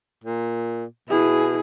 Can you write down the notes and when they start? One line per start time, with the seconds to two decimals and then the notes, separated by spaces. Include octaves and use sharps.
0.24 A#2
1.09 B2 E4 G#4